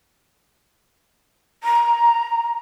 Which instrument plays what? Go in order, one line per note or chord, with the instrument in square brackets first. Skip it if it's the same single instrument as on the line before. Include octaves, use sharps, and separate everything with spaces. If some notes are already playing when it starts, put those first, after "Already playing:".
[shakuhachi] A#5